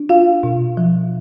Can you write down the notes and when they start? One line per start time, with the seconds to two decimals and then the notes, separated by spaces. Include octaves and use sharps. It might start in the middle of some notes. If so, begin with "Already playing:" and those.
Already playing: D4
0.09 F4 F5
0.43 B2
0.77 F3